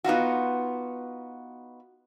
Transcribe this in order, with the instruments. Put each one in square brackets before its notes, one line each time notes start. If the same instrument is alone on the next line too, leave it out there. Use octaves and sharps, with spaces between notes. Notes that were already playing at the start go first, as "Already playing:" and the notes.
[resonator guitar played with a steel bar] B3 D#4 F4 F#4